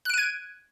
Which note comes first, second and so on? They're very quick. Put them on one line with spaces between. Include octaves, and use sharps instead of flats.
F#6 D7 D#7 G#6